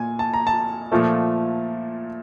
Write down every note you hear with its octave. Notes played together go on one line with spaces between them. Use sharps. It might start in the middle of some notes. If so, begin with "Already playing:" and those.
Already playing: A#2 G#5
A5
A#5
A5
A#2 F3 A3